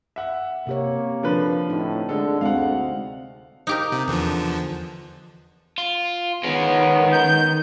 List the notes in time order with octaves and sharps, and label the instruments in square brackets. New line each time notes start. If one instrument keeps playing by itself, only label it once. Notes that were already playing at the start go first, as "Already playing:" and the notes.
[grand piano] E5 F#5
[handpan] C3 G4 C#5 [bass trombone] A#3
[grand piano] D3 F3 B4
[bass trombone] A2 [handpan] D#4
[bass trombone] D3 [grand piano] G#3 A3 A4
[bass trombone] D2 [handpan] G#3 C4 [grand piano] F5 F#5
[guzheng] D#4 G4 A#4
[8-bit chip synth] C3
E2 D3 F3
[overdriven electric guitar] F4
[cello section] D#3 [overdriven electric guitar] G#3 C#4 [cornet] B3
[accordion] G6